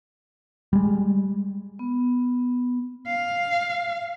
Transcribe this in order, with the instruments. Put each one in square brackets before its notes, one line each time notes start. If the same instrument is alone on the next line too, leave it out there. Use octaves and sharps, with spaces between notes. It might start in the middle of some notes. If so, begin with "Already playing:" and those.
[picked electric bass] G3 G#3
[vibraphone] B3
[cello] F5